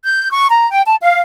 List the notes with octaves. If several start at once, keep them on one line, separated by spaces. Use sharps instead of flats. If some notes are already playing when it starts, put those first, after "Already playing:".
G6
C#6
A#5
G5
A5
F5